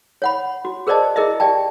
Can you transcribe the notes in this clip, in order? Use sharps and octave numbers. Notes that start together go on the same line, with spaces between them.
C#5 F#5 B5
F#4
G#4 A#4 C5 D5 D#5 A5
E4 G#4 A#4 D#5 E5
G4 D5 G5 A5